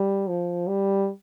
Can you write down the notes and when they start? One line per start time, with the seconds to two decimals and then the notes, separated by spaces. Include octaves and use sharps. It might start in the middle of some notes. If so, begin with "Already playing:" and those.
Already playing: G3
0.28 F3
0.68 G3